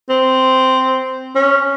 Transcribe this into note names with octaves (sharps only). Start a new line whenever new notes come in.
C4
C#4